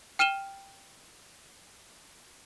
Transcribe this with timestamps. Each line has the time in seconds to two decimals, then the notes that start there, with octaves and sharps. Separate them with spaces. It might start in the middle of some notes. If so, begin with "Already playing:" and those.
0.19 G5 F6 D#7 E7 G7